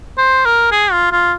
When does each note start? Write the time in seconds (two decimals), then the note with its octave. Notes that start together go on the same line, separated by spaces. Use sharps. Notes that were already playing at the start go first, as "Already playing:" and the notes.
0.18 C5
0.45 A#4
0.72 G#4
0.92 F4
1.12 F4